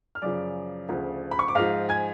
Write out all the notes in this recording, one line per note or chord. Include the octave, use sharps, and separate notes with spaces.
F6
F#2 C#3 F3 D5 D6
D2 C#3 F3
B5
C#6
D6
G#2 F3 F5 F6
G#5 G#6